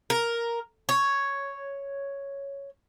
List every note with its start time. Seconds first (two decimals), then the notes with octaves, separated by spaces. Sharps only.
0.10 A#4
0.89 C#5